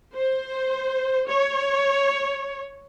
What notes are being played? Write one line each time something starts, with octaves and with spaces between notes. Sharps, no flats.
C5
C#5